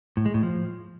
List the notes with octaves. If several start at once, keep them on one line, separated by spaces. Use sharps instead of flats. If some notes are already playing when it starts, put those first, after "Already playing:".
A2
G#3
A2
F3